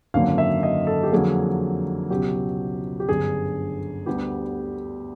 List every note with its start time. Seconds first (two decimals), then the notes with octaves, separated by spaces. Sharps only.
0.14 G#1 F#2 D3 F#3 A#3 F5
0.38 E5
0.63 D#5
0.87 A4
1.03 G4
1.12 F2 D3 F#3 A#3 G#4
2.10 C#2 B2 F#3 G4
3.00 G4
3.08 G1 F#2 D3 G#4
4.06 D2 D3 G3 B3 G4